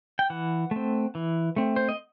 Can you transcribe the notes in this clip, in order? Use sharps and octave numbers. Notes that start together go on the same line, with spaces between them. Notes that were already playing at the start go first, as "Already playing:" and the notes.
G5
E3 F#5
A3 C4
E3
A3 C4
C5
D#5